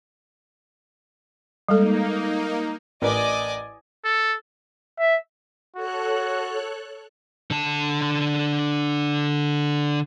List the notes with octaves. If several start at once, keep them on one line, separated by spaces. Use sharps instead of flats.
G3 G#3 A#3 D#4 A4
A1 A#4 B4 D5 D#5 G#5
A4
E5
F#4 A4 C#5 F#6
D3 A5